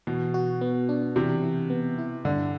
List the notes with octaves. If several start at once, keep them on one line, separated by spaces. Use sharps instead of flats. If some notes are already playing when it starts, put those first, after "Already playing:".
B2 E3
F#4
B3
D4
C3 E3
E3
B3
E4
G2 D3